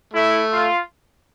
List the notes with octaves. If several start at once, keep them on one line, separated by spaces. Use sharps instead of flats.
A3 E4
F4